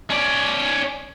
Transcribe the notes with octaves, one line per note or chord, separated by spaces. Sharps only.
C#4 D5